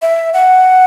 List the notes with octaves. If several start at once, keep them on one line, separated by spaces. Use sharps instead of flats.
E5
F#5